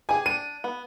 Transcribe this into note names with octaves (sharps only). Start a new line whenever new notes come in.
G4 G#4 G#5
D4 D#7
B3